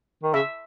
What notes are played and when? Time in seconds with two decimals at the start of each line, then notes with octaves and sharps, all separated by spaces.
0.23 D#3
0.34 C#3 E5